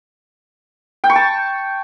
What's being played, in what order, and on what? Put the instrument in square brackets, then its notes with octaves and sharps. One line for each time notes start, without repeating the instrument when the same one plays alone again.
[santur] G5
C#6
A5